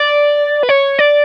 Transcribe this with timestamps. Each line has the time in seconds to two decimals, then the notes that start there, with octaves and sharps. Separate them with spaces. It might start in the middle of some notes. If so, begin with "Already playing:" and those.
Already playing: D5
0.63 B4
0.69 C#5
0.99 D5